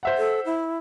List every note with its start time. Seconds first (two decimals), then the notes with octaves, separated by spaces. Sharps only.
0.03 C5 E5 F#5
0.18 A4
0.45 E4